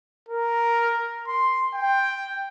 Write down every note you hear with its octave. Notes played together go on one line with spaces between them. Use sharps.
A#4
C6
G5